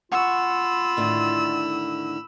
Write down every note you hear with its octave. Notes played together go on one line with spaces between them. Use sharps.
F4 F#5 B5 C#6 E6
A2 D3 D#3